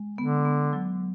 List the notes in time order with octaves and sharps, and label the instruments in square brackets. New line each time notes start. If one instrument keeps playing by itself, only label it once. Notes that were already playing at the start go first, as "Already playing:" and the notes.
Already playing: [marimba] G#3
[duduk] D3 [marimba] B3
[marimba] B3
F#3